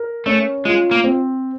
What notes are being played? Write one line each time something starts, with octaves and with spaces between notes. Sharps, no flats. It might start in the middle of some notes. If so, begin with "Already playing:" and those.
Already playing: A#4
A3 C#4
G#3 F4
A#3
C4